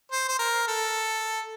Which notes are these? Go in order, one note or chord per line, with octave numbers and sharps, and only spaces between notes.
C5
C5
A#4
A4